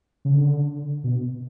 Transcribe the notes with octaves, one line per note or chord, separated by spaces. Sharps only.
C#3
D3
B2